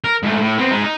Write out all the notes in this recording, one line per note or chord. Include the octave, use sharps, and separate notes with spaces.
A#4
G#2 A3
A2
B3 C4
G#3 D#4
D#4